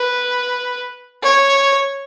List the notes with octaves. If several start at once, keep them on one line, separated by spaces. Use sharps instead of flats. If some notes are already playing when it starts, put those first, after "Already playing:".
Already playing: B4
C#5